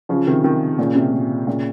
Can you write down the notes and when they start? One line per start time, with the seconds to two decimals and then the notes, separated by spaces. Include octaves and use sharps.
0.09 C#3 F3
0.27 C3 D#3
0.44 C3 D#3
0.79 A#2 C#3
0.95 C3
1.13 A#2
1.47 A#2 C#3